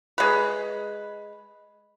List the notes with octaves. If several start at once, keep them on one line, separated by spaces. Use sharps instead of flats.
G#3 B4